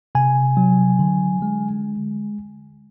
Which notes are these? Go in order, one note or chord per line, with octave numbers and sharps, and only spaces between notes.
C3 G#5
F#3
D3
G#3